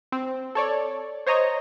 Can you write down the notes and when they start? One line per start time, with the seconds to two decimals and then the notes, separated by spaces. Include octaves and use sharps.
0.12 C4
0.55 A4 C#5 D5
1.27 C5 C#5 D#5 A#5 D#6